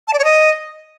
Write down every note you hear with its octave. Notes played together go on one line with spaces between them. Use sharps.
A5
D5
C#5
D#5